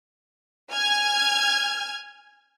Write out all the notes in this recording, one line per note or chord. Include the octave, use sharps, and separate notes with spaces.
G#5 F6 G#6